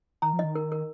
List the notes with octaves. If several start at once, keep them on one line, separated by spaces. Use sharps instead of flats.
D#3 A#5
F3
D#3 D#5
A#4
A#4